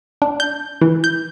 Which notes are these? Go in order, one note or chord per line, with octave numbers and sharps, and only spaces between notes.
D4
G6
E3
G6